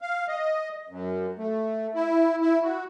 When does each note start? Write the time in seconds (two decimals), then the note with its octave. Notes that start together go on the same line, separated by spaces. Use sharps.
0.01 F5
0.28 D#5
0.89 F#2
1.38 A3
1.95 E4
2.41 E4
2.63 F#4